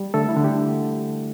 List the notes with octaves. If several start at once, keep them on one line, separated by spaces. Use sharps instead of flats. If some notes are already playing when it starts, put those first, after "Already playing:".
Already playing: G3
D3 A3 A4
E4
D3
G4